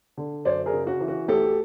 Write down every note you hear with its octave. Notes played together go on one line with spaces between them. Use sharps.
D3
F#2 C5 D5
G#4 A#4
C#3
F#4
E3
F#4
D2 G4 A4